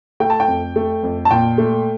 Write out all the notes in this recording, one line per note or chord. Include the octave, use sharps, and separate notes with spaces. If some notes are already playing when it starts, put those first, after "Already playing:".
A3 G5
A5
G5
F2
A3
F2
A5
A#2 G5
A3